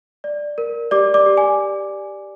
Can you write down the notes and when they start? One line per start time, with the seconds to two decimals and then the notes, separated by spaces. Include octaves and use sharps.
0.24 D5
0.58 A#4
0.91 G4 D5 D6
1.14 D5 D6
1.26 G4
1.37 G#5